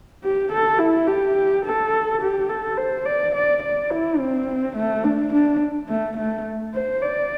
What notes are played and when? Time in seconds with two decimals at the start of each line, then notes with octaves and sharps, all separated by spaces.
0.24 G4
0.52 A4
0.79 E4
1.08 G4
1.64 A4
2.21 G4
2.49 A4
2.77 C5
3.05 D5
3.35 D5
3.62 D5
3.91 E4
4.20 C4
4.76 A3
5.04 D4
5.33 D4
5.88 A3
6.17 A3
6.74 C5
7.02 D5